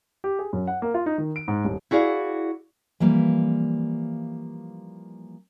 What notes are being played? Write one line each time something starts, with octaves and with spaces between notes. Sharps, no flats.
G4
G#4
F#2
F#5
A#3
F4
D#4
D#3
D7
G#2
D#1
E4 F#4 G#4 D5 F5
E3 F3 G3 A#3